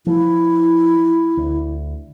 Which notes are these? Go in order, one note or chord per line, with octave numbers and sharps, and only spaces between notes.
F3 E4
D2